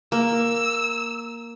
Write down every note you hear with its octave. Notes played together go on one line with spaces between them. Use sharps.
A#3 E6